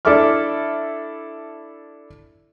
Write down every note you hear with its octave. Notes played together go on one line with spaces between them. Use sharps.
D4 E4 A4 E5 D6 F6